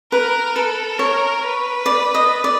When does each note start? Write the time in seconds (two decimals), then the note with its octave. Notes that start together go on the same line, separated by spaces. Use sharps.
0.12 A#4 B4
0.56 A4 B4
0.98 A#4 C#5
1.43 B4
1.86 D5
2.14 D#5
2.44 D5